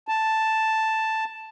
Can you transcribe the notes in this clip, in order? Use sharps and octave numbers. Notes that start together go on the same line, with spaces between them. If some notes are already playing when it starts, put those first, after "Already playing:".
A5